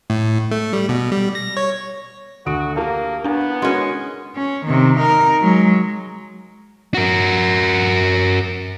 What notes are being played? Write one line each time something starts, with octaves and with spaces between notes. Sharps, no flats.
A2
A3
G3
B2
G3
A#6
C#5
D2 F#4 D#6 D7
A#3 G4 A#4 A5
B3 D4 E4
G#3 C#4 F#4 A#4
C#4
C3 D#3
D#4 A#4
F#3 G#3
F#4 A#4